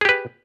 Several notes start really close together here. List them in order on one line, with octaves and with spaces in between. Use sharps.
G#4 G4 B4